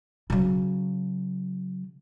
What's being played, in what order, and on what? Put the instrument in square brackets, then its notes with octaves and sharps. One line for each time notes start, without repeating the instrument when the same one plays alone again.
[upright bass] C#3 F#3